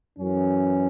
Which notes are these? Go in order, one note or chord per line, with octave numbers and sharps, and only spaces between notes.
F#2 E3 C#4